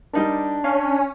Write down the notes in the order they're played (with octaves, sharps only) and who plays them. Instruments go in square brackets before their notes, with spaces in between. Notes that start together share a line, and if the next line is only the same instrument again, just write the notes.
[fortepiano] G3 D#4 A#4 [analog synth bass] D4
[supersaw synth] C#4 [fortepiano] F5